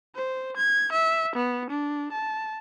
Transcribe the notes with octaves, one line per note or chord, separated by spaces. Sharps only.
C5
G#6
E5
B3
D4
A5